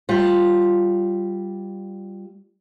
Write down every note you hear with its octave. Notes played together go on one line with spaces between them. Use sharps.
G3 F4